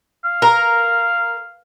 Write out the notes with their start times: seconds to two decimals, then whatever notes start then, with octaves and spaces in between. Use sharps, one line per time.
0.24 F5
0.42 A#4